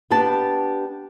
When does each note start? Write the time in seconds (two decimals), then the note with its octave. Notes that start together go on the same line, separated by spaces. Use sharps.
0.10 B3 D4 G4 B4 A5